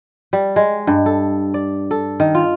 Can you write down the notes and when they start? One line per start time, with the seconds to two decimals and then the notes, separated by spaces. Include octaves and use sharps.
0.33 G3
0.56 G#3
0.87 G2
1.06 A4
1.54 D5
1.91 A4
2.20 D#3
2.35 F4